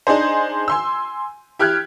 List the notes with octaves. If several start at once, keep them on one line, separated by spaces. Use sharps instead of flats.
D4 D#4 G#4 C5
G#5 C6 E6
E4 G4 F6 F#6 G#6